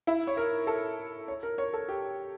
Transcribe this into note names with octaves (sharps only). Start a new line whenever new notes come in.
E4
C#5
A#4
A4
C#5
A#4
C#5
A4
G4